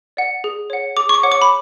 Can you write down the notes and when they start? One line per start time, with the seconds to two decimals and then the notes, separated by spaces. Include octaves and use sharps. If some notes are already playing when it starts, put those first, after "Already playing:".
0.17 D5 F#5
0.44 G#4
0.70 C#5 F#5
0.97 G#4 D6
1.09 C#6
1.14 D6
1.23 C#5 F#5
1.32 D6
1.42 B5